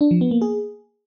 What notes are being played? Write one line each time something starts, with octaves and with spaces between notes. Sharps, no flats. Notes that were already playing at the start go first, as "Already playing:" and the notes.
D4
F3
B3
A#3
G#4